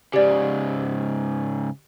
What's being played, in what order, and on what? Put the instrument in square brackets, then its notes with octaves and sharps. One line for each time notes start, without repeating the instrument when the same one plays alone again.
[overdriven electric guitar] G#2 C#3 [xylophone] G4 D5